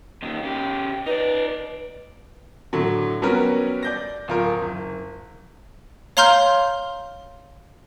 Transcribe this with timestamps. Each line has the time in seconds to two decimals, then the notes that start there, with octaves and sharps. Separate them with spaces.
0.23 A#2 D#3
0.43 C#3 G4
1.06 D#4 B4 D5
2.73 A2 D3 F#3
3.22 F#3 G3 B3 C#4 F#4 A#4
3.83 D5 G6 A#6
4.28 D1 F4 A#4
4.62 F#1
6.17 C#5 F5 A#5 C6 F6 G6